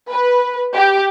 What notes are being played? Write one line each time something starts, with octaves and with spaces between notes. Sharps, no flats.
B4
G4